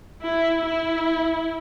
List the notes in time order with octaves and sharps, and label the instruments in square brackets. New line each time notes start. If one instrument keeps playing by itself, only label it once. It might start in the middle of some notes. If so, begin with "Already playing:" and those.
[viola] E4
E4